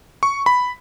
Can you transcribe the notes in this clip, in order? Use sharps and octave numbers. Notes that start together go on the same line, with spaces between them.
C#6
B5